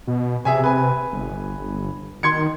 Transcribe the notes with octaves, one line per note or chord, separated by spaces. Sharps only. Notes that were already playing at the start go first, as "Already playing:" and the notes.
B2
C3 G#4 E5 G#5
B4 G#5
G1
D#3 C6 G#6 C#7